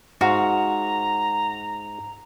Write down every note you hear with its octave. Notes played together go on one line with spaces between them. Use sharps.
G#2 F#4 F5 A#5